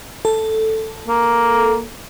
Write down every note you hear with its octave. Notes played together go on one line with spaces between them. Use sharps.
A4
A#3